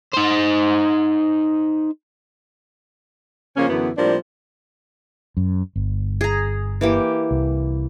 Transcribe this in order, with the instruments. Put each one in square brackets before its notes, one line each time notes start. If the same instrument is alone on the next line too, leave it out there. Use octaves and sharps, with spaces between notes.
[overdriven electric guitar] D#4 C5
[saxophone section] C#3 F3 A#3 C#4
F#2 D3 E3 B3
A2 F3 G3 A#3 C4 D4
[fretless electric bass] F#2
G1
[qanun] G#4 A#5
E3 A#3 G4
[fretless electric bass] C2